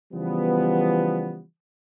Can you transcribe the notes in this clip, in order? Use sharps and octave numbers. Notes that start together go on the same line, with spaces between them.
C#3 E3 F3 G3 B3